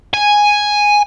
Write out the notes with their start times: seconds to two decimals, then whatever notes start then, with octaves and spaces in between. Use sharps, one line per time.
0.14 G#5